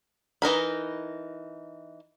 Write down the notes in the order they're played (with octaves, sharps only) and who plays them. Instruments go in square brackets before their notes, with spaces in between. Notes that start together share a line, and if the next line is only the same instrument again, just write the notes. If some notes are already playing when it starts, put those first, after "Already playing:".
[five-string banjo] E3 D#4 A#4 B5